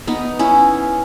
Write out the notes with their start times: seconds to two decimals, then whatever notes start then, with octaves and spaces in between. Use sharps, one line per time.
0.07 B3 D#4
0.39 C#4 E4